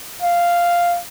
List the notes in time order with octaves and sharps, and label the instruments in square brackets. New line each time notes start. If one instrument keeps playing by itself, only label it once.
[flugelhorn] F5